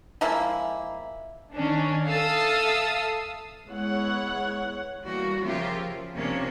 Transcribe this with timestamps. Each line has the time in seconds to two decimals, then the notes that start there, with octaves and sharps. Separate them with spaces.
0.21 F3 G#3 A#3 E4
1.53 D#3 C#4 D4
2.07 A4 E5 F5 A5 D#6 E6
3.69 G#3 B3 E4 C#5 F#5
5.04 E3 G3 A#3 F#4
5.45 C#3 F3 F4 G4 A#4 E5
5.83 F3
6.15 C3 F3 A#3 C#4 D4